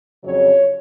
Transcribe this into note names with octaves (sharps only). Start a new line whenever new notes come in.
F2 C#3 F#3 C#5